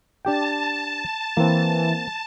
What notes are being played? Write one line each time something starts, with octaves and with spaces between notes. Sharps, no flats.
D4 G4 G5 A5
E3 A#3 C4